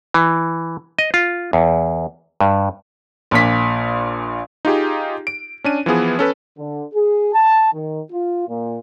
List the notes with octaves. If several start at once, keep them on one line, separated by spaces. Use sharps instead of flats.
E3
D#5
F4
E2
G2
A#1 A#2 B6
D#4 F4 G4 G#4
D7
C#4 D4 D#7
E3 F3 B3 G#4
C#4 A4 B4
D3
G#4
A5
D#3
F4
A#2